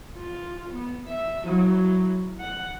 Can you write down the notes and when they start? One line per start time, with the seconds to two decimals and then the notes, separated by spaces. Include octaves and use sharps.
0.17 F4
0.73 B3
1.08 E5
1.45 F#3 E4
2.40 F#5